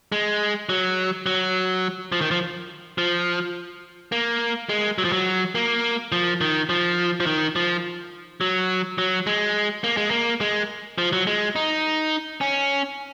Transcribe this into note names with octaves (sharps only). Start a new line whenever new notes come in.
G#3
F#3
F#3
F3
D#3
F3
F3
A#3
G#3
F#3
F3
F#3
A#3
F3
D#3
F3
F3
D#3
F3
F#3
F#3
G#3
A#3
G#3
A#3
G#3
F3
F#3
G#3
D#4
C#4